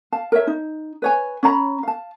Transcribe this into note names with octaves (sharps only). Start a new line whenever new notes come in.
F5 A5
A#4 C#5 E5
D#4
B4 C#5 G#5
C#4 C#5 A#5 B5
F5 A5